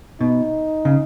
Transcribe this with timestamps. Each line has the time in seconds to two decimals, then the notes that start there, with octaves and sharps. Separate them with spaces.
0.20 B2 D#4
0.85 C#3